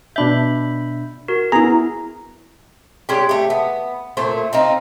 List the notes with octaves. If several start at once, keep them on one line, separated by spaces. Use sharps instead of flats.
B2 D4 E5 B5 G6
F#4 A#4
B3 E4 G#4 A#5
G#3 C#4 D4 G4
A3 G4
B3
A#2 A3 C5
C4 D#4 F4